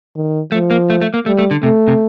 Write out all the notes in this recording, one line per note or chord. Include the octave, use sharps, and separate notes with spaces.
D#3
F3 A3
A#3
A3
A3
A#3
G3 A3
A3
D3
C3 A3
C3